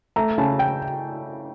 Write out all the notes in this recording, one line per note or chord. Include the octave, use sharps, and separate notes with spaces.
A3 A#5
C#3 A5
G5